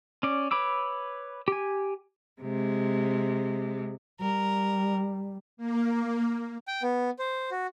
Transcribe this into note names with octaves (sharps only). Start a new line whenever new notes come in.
C#4 D5
B4 C#5 B5 D6 E6
G4 G#5
C3 G#3
G3 A#4
A#3
G5
B3
C5
F#4